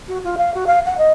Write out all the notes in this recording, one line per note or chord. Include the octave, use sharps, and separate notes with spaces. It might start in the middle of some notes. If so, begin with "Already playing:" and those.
F#4
F4
F5
F#4
F5
F#5
D#5